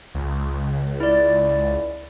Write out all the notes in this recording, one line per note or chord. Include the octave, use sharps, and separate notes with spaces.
C#2
E4 D5